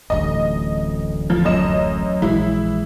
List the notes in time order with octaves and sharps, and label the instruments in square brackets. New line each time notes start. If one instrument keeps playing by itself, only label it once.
[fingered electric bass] D1 A1 D2 [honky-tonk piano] D#5
[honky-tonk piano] F3
F#2 D#5 E7
[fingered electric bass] A#1 E3 G#3 [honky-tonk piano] E4